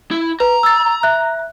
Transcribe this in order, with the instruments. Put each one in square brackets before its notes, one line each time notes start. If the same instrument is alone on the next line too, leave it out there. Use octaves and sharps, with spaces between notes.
[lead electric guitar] E4
[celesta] B4 [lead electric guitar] A#5
[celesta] E6 A6
E5 F#6